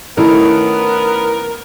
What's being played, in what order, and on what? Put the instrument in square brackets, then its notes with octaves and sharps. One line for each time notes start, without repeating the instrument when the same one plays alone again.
[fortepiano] D#3 A3 [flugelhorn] B3 [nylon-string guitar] C#4 E4 [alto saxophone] A#4